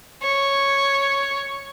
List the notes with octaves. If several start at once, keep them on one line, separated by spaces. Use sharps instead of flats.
C#5